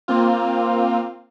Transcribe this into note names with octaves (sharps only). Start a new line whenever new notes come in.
A#3 C4 F4